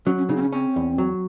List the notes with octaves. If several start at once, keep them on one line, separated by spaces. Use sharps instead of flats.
F#3 C#4
C#4
C#3 D#4
C4
C#4
C4 C#4
E2
F#3